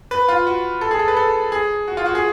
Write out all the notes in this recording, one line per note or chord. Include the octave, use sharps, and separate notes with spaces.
B4
F4
F#4
A4
G#4
A4
B4
A4
G#4
F#4
F4
F#4
G#4